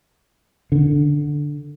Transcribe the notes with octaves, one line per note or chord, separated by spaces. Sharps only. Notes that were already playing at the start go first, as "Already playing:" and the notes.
D3